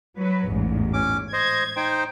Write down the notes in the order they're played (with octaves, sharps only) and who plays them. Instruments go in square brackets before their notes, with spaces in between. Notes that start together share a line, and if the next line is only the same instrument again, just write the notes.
[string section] F#3 B4
A1 E2 G#2
[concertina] C#4 D6
[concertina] C5 D#5 [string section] G#6
[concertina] D#4 C5 G5